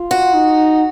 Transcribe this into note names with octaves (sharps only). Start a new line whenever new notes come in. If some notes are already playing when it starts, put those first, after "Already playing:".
Already playing: F4
F#4
D#4